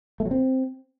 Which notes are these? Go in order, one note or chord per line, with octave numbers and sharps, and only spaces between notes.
A3
F#3
C4